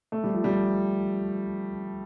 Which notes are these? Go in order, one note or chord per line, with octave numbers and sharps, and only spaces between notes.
A3
G3
F3
G3